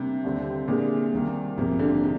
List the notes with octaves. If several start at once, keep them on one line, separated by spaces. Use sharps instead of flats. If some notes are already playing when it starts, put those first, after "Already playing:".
Already playing: C3 G3 A#3 D4
D#2 D3 G3 C4
A#2 D3 G#3 D4
C2 C3 D#3 A#3
A#1 G#2 C3 F3 A#3
D3
C3 F3 G#3 D#4